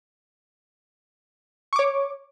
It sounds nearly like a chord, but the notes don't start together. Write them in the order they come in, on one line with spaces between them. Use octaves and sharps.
C#6 D6 C#5